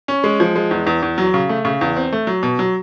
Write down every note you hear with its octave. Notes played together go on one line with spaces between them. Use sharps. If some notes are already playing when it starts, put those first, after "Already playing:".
C#4
G#3
F3
G#3
E2
E2
E2
F#3
C#3
A3
C#3
E2
C4
A3
F#3
B2
F#3